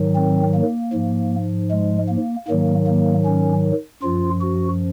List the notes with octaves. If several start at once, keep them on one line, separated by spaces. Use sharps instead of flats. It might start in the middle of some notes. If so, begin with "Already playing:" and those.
Already playing: G#2 D#3 F#3
C4
A#3
G#2 F3
G#3
A#3
G#2 D#3 F#3 A#3
A#3
C#4
F#2 F3 F4
F#4